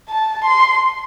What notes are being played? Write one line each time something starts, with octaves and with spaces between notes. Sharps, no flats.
A5
C6